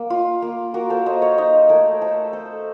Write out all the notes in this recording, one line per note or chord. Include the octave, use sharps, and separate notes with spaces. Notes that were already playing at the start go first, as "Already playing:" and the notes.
Already playing: A#3
F4
A#3
A#3 F#4 A#4
A4 C5
A#3 C5 D#5
C#5 F5
D#4 C5 D#5
A3 A#4 C#5
A3 A4 C5
A3 A4 C5